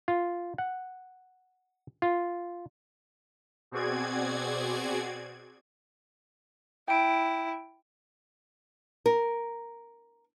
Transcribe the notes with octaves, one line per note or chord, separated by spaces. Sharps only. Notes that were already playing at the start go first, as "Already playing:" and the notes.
F4
F#5
F4
B2 C4 F#4 G#4 D5 G#6
E4 G5 D7
A#4